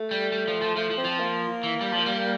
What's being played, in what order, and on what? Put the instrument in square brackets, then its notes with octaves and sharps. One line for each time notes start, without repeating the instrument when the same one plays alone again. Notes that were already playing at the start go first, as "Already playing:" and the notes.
Already playing: [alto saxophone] A3
[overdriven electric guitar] G3
G3
F3
F3
[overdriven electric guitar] F3 [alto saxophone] A3
[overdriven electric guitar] F3
[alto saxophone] C4
[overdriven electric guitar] F3
[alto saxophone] A#3
[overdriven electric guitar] E3
G3
F3
G3